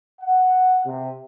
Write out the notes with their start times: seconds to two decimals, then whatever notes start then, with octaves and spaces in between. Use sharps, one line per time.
0.21 F#5
0.86 C3